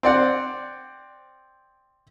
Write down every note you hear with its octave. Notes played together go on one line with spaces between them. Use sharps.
C4 D5 F#5